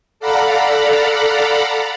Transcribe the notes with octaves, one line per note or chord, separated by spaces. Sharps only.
A4 D5 F5 F#5 A#5 B5